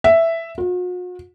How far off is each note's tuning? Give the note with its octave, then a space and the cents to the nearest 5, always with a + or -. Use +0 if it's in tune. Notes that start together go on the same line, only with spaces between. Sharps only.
E5 +5
F#4 -45